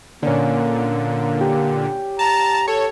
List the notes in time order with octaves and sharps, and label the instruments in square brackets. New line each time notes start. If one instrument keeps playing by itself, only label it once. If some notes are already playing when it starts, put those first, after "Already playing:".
[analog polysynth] A#2 D3 [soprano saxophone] A#3 [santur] C#4 D5
[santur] G4
[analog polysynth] A5 [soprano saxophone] A#5
[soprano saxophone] A4 [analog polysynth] C#5